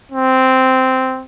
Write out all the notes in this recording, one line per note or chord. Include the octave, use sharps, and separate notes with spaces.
C4